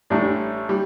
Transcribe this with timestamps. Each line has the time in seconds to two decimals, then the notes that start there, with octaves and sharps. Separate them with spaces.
0.10 A1 A2 G3 D4
0.69 G3